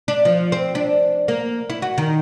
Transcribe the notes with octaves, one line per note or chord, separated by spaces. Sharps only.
D4
F3
C4
D4
A#3
E4
F#4
D#3